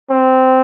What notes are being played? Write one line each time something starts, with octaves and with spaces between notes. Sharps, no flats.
C4